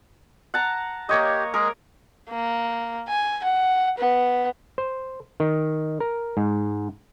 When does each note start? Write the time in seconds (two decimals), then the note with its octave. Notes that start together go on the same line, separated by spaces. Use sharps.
0.54 F#5 A5 A#5
1.09 A#3 G4 C#5 D#5
1.54 G#3 G#4 A#4
2.30 A#3
3.08 G#5
3.43 F#5
3.98 B3
4.78 C5
5.40 D#3
6.00 A#4
6.37 G#2